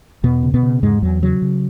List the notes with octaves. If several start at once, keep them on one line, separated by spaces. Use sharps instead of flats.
E2 B2 B3
C#3
B2 B3
C#3
E2 G#2 G#3
E2 F#3
C#3 F#3
C#3